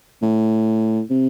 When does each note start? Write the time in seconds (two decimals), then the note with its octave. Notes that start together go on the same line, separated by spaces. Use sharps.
0.22 A2
1.10 C3